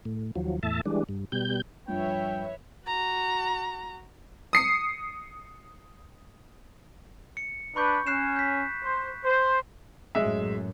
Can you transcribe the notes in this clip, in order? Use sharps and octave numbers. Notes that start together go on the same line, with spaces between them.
A2
D#2 F3 F#3
E2 A2 E5 A5
E3 G3 G#3 D4
G2
B2 G3 G6
G2 F3 B4 C#5 E5 G5
F#4 A#5
D#6 C7 C#7
C#7
D4 B4 B5 C#6 G6
C#4 F#6 C7 E7
G6 B6
C5
C5
F#2 A2 G#3 E5